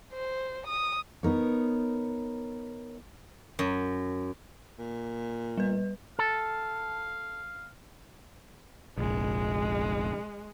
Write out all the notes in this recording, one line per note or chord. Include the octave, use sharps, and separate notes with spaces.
C5
D#6
B3 D#4 A#4 C#5
F#2
A#2
G3 B4
A4 F5
F1 A#1 G#3